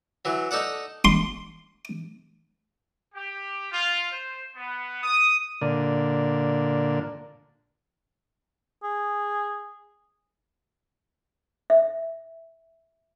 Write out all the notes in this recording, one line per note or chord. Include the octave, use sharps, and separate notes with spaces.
E3 F#3
D#4 A4 D5 F#5
C6
G4
F4
C5
B3
D#6
A#2 D3
G#4
E5